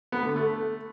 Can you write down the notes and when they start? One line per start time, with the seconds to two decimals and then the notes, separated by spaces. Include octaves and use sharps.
0.12 B3
0.24 D3
0.36 A3